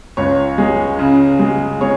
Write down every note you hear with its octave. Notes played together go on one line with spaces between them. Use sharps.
C#2 C#5
G#3
C#3
G#3
G#3 C#5